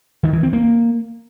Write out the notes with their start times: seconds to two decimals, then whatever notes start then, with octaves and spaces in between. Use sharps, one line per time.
0.23 D#3
0.33 E3
0.43 C4
0.53 A#3